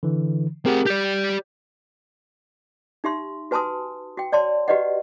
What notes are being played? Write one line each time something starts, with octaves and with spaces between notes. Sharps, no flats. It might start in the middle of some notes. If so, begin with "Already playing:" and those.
D3 E3
C4 G4 G#4 A#4 F#5
G4 D5 G6
D#4 G4 E5 C6
F#4 B4 G#5 A5 C6 D#6
F#4 G5
C#5 D5 A5 C6
F#4 G4 B4 D5 D#5 F#5